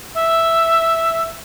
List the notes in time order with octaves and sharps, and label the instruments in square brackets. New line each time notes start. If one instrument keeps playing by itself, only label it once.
[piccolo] E5